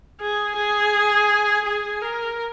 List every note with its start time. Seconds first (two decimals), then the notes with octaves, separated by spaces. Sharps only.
0.21 G#4
0.56 G#4
1.65 G#4
2.01 A#4